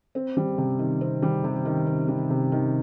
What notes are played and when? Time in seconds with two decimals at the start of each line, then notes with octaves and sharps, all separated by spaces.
0.15 C4
0.37 G3
0.58 C3
0.79 D#3
1.01 C4
1.22 G3
1.44 C3
1.65 D#3
1.87 C4
2.08 G3
2.30 C3
2.52 D#3